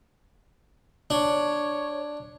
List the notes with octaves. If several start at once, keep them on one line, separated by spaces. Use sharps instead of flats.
D4 C#5